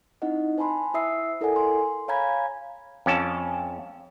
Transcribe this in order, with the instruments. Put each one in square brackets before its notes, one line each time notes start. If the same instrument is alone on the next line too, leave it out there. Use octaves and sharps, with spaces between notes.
[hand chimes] C4 D#4 E4 D#5 F#5
C5 G#5 A5 B5 C6
E4 C5 E5 D#6 E6 C7
E4 A4 A#4 D5 F#5 G#5
C6
C#5 F5 G#5 A#5 B5 G#6
[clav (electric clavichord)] F2 C#4 A5